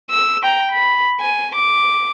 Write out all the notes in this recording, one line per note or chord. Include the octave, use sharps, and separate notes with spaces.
E6
G5 A#5
B5
G#5
D6